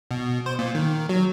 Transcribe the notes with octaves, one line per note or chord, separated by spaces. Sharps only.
B2
C5
A#2
D#3
F#3